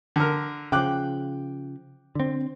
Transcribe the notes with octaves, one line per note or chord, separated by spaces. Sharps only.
D3 A#4
C#3 F3 G5 D6 F#6
D3 C4